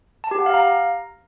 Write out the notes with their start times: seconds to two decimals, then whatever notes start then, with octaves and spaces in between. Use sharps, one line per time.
0.24 A5
0.31 G4
0.39 F#5
0.46 F5
0.54 A#5